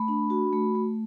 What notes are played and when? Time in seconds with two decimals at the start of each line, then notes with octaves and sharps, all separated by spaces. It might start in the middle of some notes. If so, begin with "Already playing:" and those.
Already playing: A3 B5
0.08 D4
0.30 F#4
0.53 A3
0.75 A3